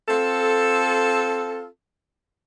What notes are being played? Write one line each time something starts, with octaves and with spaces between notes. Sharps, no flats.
C4 F4 A4